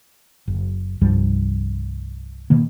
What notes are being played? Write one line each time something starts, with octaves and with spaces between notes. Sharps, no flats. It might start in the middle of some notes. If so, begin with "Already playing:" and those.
F#1
C2 G2 F3 G3
B2 D#3 A#3